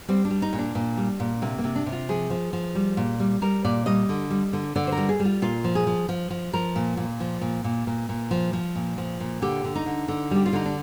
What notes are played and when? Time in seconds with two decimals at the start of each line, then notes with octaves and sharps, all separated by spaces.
0.08 G3 C4
0.25 D4
0.30 G3
0.42 D#4
0.53 A#2
0.58 D4
0.75 A#2
0.97 G3
1.20 A#2
1.42 C3 A#3
1.58 A#3
1.64 C3
1.76 D4
1.86 C3
1.92 F4
2.09 F3 G#4
2.30 F3
2.53 F3
2.75 G3
2.97 A#2
3.20 G3
3.42 G3 A#4
3.64 A#2 D5
3.86 G3 D#5
4.09 D3
4.30 G3
4.53 D3
4.76 D3 D5
4.87 C5
4.92 A#4
4.97 G3
5.09 G#4
5.20 G3
5.25 F4
5.42 A#2 F4
5.64 F3
5.75 G#4
5.87 F3
6.09 F3
6.30 F3
6.53 F3 A#4
6.76 A#2
6.97 A#2
7.20 F3
7.41 A#2
7.64 A#2
7.87 A#2
8.09 A#2
8.31 F3
8.53 F3
8.75 A#2
8.98 F3
9.20 A#2
9.42 D3 G4
9.64 D3
9.75 D#4
9.86 D3
10.08 D3
10.31 G3 G4
10.46 F4
10.53 D3 D#4
10.66 D4